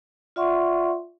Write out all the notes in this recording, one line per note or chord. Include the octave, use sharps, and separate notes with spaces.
F4 D5 E5 F#5 C6 C#6